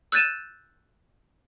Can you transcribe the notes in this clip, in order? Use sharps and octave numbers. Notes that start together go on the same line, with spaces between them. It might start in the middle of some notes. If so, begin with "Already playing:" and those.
E6 F#6 G6 A6 D#7 E7